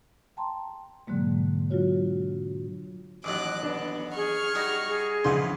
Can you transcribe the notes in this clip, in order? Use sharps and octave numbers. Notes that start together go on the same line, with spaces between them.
G5 A5 A#5 C6
G#2 B2 D3 F#3 G#3 A#3
F#3 D4 F4 F#4 C#5
A1 D#2 F#3 D6 F#6
B3 D4
G#4 C#6 F6
G3 D#4 F#4
G#4
C#2 D3 E3 F3 C6